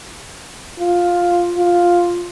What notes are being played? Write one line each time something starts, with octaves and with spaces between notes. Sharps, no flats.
F4
F4